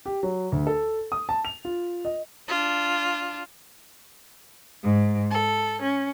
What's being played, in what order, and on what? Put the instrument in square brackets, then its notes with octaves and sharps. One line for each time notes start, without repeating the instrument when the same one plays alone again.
[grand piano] G4
F#3
D2
A4
D#6
A5
F7
F4
D#5
[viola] D4 F4
[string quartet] G#2
A4
C#4